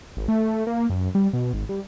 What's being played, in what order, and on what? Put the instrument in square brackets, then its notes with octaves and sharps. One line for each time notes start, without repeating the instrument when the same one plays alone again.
[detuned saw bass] G#1
A3
A#3
F#2
G3
B2
G#1
G3